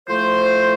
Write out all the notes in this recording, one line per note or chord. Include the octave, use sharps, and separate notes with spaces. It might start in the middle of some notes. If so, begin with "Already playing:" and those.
A2 F3 A3 C5